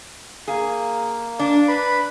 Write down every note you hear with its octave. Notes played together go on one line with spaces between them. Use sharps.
A#3 G#4
D4
B4 B5